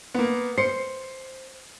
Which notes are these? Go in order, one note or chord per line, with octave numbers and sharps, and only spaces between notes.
A#3 B3
C5 C7 C#7